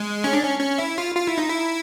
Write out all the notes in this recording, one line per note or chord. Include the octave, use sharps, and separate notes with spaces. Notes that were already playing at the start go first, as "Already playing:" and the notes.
Already playing: G#3
C#4
D4
C#4
C#4
E4
F4
F4
E4
D#4
E4